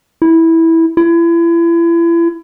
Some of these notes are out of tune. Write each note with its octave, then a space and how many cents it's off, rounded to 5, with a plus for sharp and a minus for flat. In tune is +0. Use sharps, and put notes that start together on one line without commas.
E4 -10
E4 +35